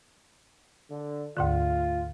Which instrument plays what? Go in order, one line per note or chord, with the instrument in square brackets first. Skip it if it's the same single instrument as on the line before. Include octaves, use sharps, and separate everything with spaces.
[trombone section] D3
[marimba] D2 G#2 D3 [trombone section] A3 F4